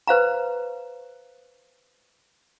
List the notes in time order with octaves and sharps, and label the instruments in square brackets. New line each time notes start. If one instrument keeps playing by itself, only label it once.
[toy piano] B4 C5 F5 A#5